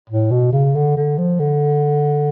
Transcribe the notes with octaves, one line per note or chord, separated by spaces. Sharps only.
A2
B2
C#3
D3
D3
F3
D3